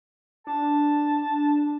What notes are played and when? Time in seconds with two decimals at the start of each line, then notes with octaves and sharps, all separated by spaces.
0.47 D4 A5